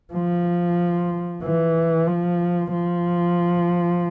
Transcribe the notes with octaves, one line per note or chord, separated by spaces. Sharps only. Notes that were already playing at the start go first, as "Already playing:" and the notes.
F3
E3
F3
F3